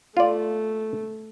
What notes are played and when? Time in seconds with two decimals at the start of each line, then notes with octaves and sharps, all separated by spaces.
0.17 A3 F4 D5